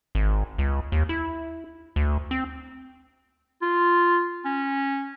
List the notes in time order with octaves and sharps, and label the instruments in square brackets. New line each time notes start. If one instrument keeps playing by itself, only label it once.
[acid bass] G#1
C#2
D#2
E4
D2
C4
[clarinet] F4
C#4